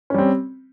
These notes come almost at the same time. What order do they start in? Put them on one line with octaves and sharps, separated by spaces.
C#4 G3 C4